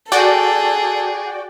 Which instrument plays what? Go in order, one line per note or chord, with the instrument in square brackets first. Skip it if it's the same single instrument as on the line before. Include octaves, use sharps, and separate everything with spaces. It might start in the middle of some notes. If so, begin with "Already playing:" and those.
[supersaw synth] F#4 D5 G5 [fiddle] G#4 [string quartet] A4